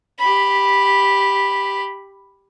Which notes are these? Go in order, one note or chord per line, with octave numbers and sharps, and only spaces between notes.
G4 B5